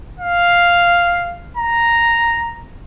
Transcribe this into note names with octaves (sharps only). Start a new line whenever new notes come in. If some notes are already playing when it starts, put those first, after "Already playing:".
F5
A#5